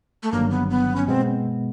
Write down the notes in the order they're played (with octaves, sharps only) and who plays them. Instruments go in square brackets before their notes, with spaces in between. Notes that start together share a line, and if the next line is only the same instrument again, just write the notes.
[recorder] A3
[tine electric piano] G1 G2 D#3 F#3 [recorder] A#3
[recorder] B3
B3
C#4
[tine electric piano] B2 G#3 B3 [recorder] C4